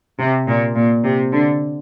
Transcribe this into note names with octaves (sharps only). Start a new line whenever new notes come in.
C3
A#2
A#2
C3
D3